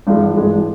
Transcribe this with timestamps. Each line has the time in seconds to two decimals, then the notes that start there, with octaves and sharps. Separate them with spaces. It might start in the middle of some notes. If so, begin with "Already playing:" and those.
0.07 G#1 G2 E3 G#3
0.37 G#1 G2 E3 G#3